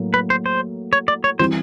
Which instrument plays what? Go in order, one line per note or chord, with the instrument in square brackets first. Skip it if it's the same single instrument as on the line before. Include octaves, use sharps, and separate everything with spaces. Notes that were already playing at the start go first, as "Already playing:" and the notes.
Already playing: [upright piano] A2 F#3 A#3
[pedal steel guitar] B4
C5
C5
C#5
D5
C#5
[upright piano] E3 G3 C4 E4 G4 [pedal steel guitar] C5